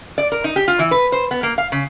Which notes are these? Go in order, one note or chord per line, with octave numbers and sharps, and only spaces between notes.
D5
A#4
D#4
G4
F4
E3
B4
C5
B3
A#3
F5
C#3